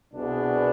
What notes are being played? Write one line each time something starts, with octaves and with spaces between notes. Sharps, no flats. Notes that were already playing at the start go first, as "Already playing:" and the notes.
C2 B2 B3 D4 G#4